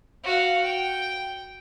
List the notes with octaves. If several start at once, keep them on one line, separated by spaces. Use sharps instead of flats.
F#4 F5
G5